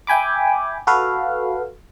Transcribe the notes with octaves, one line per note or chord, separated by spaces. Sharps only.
E5 G5 G#5 B5 D6
F#4 A4 B4 F5